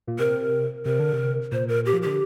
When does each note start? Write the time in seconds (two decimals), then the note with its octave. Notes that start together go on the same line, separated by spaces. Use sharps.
0.07 A#2
0.19 C3 A#4
0.85 C3 A#4
0.99 D3
1.13 C3
1.52 A#2 C5
1.68 A#4
1.86 G4
1.93 F3
2.03 D3 G4